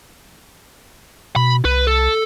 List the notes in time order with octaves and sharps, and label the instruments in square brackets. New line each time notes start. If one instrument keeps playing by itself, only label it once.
[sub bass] B2 [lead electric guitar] B5
[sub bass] C2 [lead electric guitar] B4
[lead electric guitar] A4